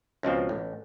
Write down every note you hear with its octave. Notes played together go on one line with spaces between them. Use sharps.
C#2 B2 F3 C4
A1